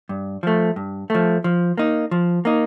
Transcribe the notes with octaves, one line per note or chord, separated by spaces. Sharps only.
G2
F3 A3
G2
F3 A3
F3
A#3 D#4
F3
A#3 D#4